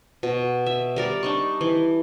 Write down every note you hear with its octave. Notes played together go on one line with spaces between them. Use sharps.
B2
E5
G3 A#4 D5
D4 D#4 C#6
E3